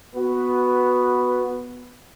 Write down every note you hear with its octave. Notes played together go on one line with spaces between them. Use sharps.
B3 F#4 B4